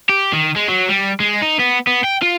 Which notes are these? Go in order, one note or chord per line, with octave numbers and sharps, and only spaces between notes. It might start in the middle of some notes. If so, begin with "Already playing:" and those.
G4
D#3
G#3
F#3
G3
G#3
D#4
B3
B3
G5
F4